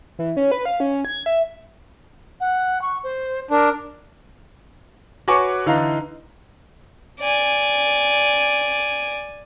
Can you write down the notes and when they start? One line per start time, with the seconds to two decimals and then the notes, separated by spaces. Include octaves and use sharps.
0.19 E3
0.37 C#4
0.51 B4
0.65 F5
0.80 C#4
1.05 G#6
1.26 E5
2.40 F#5
2.82 C#6
3.04 C5
3.50 D4 A#4
5.28 F#4 B4 C#5 G#5 C#6 D6
5.66 D3 E3 D#4 F5 A#5
7.21 D5 G#5